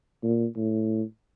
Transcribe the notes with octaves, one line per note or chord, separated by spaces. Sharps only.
A#2
A2